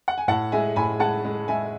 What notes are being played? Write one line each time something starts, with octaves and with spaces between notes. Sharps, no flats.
F#5
G#5
A2 F#5 A5
G#3 E5 G#5
A2 G#5 B5
G#3 F#5 A5
G#3
G#3 E5 G#5